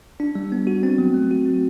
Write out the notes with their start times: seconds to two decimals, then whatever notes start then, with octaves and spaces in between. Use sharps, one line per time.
0.20 D4
0.35 G3
0.52 B3
0.67 F#4
0.83 C4
0.98 F#3
1.14 A3
1.31 F#4
1.46 C4